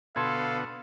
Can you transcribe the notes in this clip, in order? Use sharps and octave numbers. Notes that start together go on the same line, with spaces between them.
B2 D3 B3 A4 F5 C6 G#6